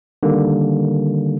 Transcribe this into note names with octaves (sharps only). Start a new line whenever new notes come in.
D3 D#3 G3 A#3